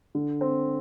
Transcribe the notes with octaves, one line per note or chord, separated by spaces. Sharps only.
D3
C4